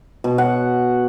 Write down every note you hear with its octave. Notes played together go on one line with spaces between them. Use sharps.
B2
F#5